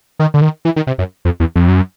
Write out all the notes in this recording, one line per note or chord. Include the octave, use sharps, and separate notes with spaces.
D#3
D3
D#3
E3
D#3
C3
F#2
F2
E2
F2
F#2